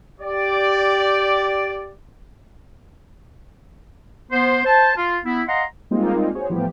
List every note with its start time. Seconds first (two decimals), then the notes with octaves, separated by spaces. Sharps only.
0.20 G4 D5
4.32 B3 C5
4.65 C5 A5
4.96 F4
5.25 B3 E4
5.48 D#5 F5 F#5 A#5 C6
5.91 G3 G#3 A#3 C4 D#4 F4
6.35 F#4 G#4 C5 C#5
6.49 A2 E3 F3 G3 B3 G4